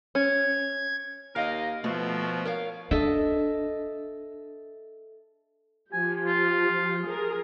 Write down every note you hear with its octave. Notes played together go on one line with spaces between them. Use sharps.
C#4 G#6
D#2 A#4 D#5 F5
B2 F3 A3
A#4 C#5 F5
D4 A4 D#5 E5
F3 G4 G#5
F4
G#4 A#4